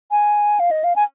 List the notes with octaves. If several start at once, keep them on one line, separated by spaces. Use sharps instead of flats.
G#5
F5
D#5
F5
G#5